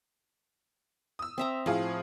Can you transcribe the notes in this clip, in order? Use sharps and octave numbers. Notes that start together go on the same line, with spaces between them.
D#6 E6
C4 E5 A#5
A2 F3 G#4 F5